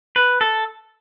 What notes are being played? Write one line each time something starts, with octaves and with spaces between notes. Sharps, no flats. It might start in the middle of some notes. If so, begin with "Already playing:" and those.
B4
A4